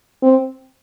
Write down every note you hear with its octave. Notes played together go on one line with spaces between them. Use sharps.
C4